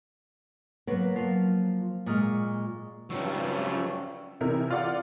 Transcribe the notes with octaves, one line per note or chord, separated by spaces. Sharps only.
F#3 A#3 B3 B4 C#5
F3 F5
A#2 G#3 C#6 D#6 F6
G#1 G2 C#3 F3 F#3 C#6 E6
C3 E3 D#4 E4 A#4
F4 D5 F#5